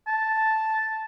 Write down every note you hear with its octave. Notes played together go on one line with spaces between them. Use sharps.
A5